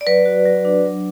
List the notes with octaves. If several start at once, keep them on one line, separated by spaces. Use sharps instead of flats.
D5
F#3 B4
F#4
F#3
D4
F#3